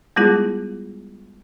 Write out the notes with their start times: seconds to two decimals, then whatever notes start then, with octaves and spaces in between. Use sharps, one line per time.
0.16 G3 G#3 B3 E4 F4 G#4